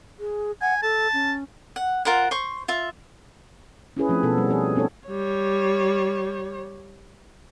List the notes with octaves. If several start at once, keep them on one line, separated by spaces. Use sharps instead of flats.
G#4
F#5 G#5
A4 A5
C#4
F#5
F4 A#4 C5 F#5
C5 C#6
F4 E5
C#4 E4 G#4 B4
F3 A3 C4
B2 B3 A4
G3
F3 G#4 C#5
B3 C4 D4 A4 C#5
G3 C#5